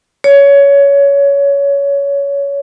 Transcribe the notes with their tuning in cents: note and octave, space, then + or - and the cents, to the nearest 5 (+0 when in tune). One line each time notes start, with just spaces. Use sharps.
C#5 +20